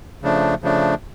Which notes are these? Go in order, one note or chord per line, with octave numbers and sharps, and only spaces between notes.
C#3 F3 A3 D4
C#3 F3 A3 D4